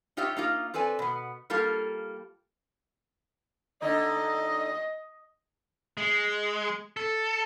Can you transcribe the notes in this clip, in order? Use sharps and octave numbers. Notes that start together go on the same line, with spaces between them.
D#4 F4 G4 C#5 E5
A#3 D#4 F4
C4 A4 B4 D5 G#5
B2 B3
G3 A#3 F4 A4
D3 D#4 D#5
G#3
A4